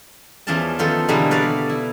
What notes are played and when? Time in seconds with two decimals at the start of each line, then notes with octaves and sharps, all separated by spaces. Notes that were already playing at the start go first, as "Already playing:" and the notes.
0.47 E2 E3 F3 C#4 D5 A5
0.79 D#3 F3 B3 F4 A4
1.08 B2 D3 E3 G3 G#3 A#3
1.31 F#4 B4 D5 F5
1.69 E4